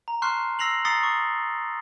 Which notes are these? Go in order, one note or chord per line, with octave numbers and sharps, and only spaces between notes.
A#5
A5 C6 C#6 F6 F#6 C7
E6 A#6 C7 F7 F#7
A#5 D#6 A6 C7 C#7 G7
C#6